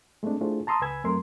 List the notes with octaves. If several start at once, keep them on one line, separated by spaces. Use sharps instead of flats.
G#3 A3 B3 C4 D4
A3 D4 E4 F4 G#4 C5
A5 A#5 C6 D#6 E6
C#2 B4 G#5 B5 E6 G#6
F#2 F#3 A3 C4 A#4 C6